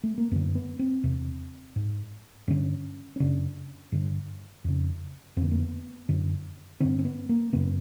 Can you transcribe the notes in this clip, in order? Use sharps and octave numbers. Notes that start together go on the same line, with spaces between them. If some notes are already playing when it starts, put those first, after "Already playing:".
A3
A#3
F#2 D3 B3
B3
C4
E2 C3
G#2
G2 D3 C#4
C#4
F#2 C#3 D4
G2 D3
F2 C#3
F2 D3 B3 C4
A#3
B3
F#2 D3
G2 D3 C4
C4
B3
A#3
F#2 C#3 B3